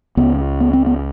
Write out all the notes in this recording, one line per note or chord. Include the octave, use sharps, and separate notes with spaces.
C#2 C#3 B3
B3
C4
B3